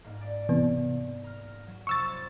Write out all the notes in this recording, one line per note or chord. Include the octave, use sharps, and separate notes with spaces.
G#2 A#3
D5
C3 E3 B3
A#5 F6
F#3
F2 C3 C#6 E6 A6